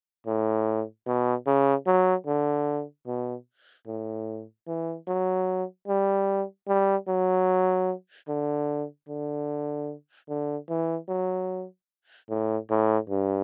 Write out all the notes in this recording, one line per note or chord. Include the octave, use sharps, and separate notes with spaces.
A2
B2
C#3
F#3
D3
B2
A2
E3
F#3
G3
G3
F#3
D3
D3
D3
E3
F#3
A2
A2
G2